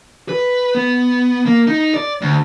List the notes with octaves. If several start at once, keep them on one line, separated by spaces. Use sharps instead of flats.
B4
B3
A#3
D#4
D5
D2